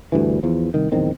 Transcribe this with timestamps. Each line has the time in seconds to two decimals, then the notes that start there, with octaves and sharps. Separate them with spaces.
0.12 D2 G2 E3
0.43 E2 F3
0.74 C2 D#3
0.92 D1 E2 D#3 C4